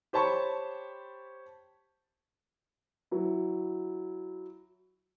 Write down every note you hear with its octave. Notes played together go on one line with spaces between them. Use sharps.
G4 C5 C#5 A5 B5 C#6
F#3 E4